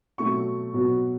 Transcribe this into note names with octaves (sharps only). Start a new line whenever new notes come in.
B2 F#3 A3 C4 C#6
B2 F#3 B3